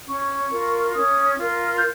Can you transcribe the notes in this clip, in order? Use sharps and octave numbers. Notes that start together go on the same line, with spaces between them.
C#4 C#6
F4 A#4
C#4 D#6
F4 A#4
G6